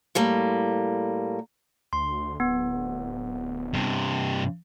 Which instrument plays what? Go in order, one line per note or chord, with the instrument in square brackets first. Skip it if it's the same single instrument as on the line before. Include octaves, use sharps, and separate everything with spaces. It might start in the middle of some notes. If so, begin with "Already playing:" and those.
[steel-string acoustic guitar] A2 G3 A#3
[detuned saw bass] D2 [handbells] C6
[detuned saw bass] D1 [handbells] B3
[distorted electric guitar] G2 C3